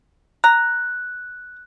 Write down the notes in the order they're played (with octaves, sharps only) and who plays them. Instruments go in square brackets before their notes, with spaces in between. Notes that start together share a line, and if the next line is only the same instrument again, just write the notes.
[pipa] A#5 [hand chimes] F#6